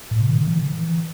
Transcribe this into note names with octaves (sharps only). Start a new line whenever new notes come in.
A2
C3
D#3
D3
E3